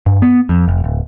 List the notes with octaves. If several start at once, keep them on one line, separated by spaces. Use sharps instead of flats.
G2
B3
F2
F1
D1